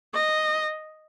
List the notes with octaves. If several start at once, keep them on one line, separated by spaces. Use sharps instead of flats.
D#5